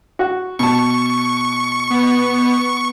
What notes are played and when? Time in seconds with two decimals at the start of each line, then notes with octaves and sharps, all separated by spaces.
0.19 F#4
0.59 B2 A5 C#6
1.90 B3